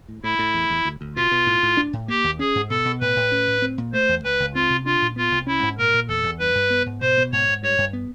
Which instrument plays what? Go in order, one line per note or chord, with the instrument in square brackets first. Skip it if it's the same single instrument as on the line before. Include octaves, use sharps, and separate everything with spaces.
[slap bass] A2
[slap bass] A2 [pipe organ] E4
[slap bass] A2
E2
E2
D2
D2
[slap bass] B2 [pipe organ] F4
[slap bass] B2
A2
A2
D4
A2
[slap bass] A#3 [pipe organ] G4
[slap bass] D#2
[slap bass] C#4 [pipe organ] G#4
[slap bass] G#2
[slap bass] B2 [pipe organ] A4
[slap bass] B2
[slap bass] A2 [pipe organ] B4
[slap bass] A2
C#4
A2
C4
A#2
[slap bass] A3 [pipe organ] C5
[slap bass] E2
[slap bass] C#2 [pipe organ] B4
[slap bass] C#2
[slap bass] C4 [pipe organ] F4
[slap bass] C3
[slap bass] D4 [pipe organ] F4
[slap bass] A#2
[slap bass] B3 [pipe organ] F4
[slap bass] C2
[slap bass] C#4 [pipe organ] E4
[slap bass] G#2
[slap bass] A#2 [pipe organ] A#4
[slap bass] A#2
[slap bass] E2 [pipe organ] A4
[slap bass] E2
[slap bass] G2 [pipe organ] B4
[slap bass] G2
B3
G#2
[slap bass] B2 [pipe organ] C5
[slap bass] B2
[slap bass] G#2 [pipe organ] C#5
[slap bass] G#2
[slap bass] G2 [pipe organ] C#5
[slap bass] G2
B3